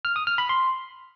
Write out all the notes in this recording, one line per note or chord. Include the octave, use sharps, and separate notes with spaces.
F6
D#6
F6
B5
C6